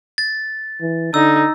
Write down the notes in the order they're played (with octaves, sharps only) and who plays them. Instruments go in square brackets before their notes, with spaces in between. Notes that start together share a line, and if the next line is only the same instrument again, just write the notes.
[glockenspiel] A6
[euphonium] E3
[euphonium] D3 [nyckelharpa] D#4 [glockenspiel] E6